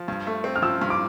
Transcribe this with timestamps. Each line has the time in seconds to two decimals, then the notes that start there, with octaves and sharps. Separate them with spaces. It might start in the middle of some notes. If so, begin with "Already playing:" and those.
Already playing: F3
0.08 G2
0.27 A3
0.44 C4
0.56 F6
0.62 F3 E6
0.81 G2
0.90 D6